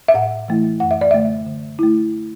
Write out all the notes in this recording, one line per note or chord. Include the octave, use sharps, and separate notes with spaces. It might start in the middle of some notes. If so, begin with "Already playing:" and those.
E5
A2 F#5
E3 A3 E4
F#2 F#5
E5
D5
D3 A3 E5
D3
A3 E4